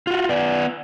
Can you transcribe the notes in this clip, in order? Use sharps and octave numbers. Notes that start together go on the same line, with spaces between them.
F4 F#4
B3 D5